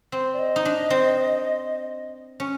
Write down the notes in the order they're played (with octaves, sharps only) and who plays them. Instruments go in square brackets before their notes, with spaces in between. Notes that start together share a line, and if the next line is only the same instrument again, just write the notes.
[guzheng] C4
[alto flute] D5
D#5
[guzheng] D#4
D4
C4
C#4